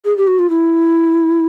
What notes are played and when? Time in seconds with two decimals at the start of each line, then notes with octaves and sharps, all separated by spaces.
0.05 G#4
0.17 G4
0.27 F#4
0.39 F4
0.49 E4